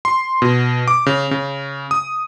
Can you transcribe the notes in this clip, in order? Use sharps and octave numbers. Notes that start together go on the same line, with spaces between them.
C6
B2
D6
C#3
C#3
D#6